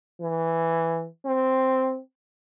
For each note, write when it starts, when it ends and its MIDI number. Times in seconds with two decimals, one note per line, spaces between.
0.21 1.08 52
1.25 2.00 60